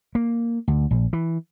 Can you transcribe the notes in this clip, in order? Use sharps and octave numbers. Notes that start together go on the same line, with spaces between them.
A#3
D2
A#1
E3